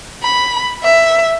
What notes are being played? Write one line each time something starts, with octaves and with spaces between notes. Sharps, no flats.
B5
E5